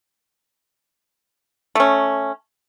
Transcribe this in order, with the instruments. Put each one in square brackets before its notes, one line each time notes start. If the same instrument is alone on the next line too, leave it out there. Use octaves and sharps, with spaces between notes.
[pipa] A3 C#4